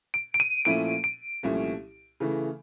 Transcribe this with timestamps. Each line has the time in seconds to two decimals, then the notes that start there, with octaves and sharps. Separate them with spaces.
0.14 D7
0.34 D7
0.40 D#7
0.65 A#2 F3 A3 C#4 E4 D7
1.04 D7
1.43 C2 A#2 F3 A3 C#4
2.20 C#3 E3 A3